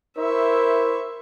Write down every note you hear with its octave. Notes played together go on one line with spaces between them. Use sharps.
E4 A#4 C5 E5 C#6